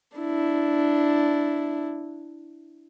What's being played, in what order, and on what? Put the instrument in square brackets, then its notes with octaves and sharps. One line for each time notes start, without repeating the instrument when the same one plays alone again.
[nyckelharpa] D4 E4